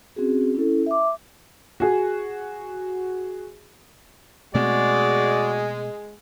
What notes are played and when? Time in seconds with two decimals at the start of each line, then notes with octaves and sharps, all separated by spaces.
0.16 C4 C#4 F#4 G#4
0.54 C#4 E4 A4
0.86 E5 D6
1.80 F#4 G#4
4.55 B2 G#3 A3 C4 F#4 D5